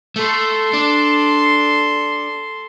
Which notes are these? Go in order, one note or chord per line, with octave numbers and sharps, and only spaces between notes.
A3 A4 C6
D4